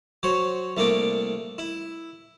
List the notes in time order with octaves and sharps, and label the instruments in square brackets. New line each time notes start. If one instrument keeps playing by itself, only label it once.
[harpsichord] F#3 C5 C#5
C2 A3 A#3 D4 D6
E4